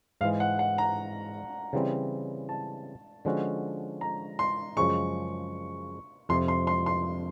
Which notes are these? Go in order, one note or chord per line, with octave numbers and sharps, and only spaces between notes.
G#2 E3 G#3 F5
F#5
F#5
A#5
C#3 E3 G3 C4
A5
D3 F3 G#3 C#4 F#4
A#5
C6
F#2 C#3 F3 G#3 C#6
F2 C3 F3 C6
C6
C6
C6